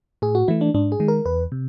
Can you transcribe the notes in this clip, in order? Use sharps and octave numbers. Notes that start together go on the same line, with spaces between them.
A2 G#4
F#4
E3 A3 E4
D4
G#2 D4
G#4
D#3 G#3
A#4
E2 B4
C3